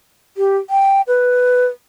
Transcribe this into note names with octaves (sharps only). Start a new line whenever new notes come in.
G4
G5
B4